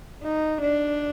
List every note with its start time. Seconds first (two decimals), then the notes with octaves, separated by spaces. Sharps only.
0.23 D#4
0.62 D4